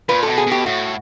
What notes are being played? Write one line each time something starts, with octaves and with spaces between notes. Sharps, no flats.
A#2 B4
B2 A4
G#4
B2 G4
A2 F#4